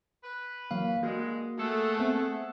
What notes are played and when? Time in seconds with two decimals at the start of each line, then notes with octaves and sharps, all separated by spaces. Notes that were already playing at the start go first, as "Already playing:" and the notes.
0.24 B4
0.71 E3 F#3 A#3 F5
1.03 G2 G#3 A#3 F#4
1.59 A3 G#4 A4 F#5
1.99 B3 C4 E5